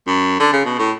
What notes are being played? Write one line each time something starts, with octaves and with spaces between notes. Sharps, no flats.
F#2
D3
C#3
B2
A2